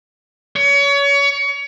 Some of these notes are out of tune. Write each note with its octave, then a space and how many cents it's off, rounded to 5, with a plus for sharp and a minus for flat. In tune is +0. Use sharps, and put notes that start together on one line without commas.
C#5 +30